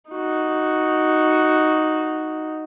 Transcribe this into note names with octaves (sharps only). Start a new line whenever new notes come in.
D#4 F#4